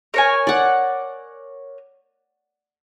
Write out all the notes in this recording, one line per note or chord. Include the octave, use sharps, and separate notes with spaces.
A#4 C#5 G#5
D5 F#5